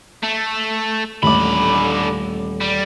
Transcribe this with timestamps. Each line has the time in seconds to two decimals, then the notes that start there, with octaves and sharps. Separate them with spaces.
0.23 A3
1.23 D#1 A1 D3 B5 D6
2.61 G3